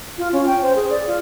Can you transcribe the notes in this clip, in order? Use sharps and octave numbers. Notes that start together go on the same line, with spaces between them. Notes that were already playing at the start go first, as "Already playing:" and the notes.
F4
C#4
G5
C5
G#4
D5
F4